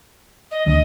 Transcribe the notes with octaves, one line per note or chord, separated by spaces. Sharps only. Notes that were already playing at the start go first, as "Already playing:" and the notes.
D#5
D2 D#5